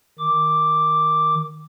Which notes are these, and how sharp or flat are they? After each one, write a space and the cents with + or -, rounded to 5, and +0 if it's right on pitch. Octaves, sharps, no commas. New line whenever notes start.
D#3 +0 D6 +0